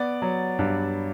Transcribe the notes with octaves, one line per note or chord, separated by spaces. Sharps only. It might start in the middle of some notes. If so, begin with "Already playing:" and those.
Already playing: B3 D5
F#3
G2